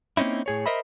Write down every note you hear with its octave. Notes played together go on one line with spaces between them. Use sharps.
A#3 C4 C#4 D#4 E4
A2 G#4 C#5
A#4 C5 D#5 E5 B5